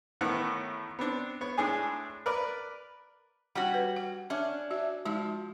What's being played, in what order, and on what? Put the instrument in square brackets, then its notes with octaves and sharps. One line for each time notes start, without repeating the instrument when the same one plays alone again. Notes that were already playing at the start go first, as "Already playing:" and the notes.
[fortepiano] A1 A2 D#3 B3 F#5
B3 C4 D4
B3 C#5
A2 G#3 D4 G#4 G#5
A#4 B4 D5
[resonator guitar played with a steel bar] G3 C#4 F#4 [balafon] F#5
[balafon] B4
F#5
[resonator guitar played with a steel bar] C#4 D4 [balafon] E5
[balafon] F#4 E5
[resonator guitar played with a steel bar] F3 [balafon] G#3 D#4 F#4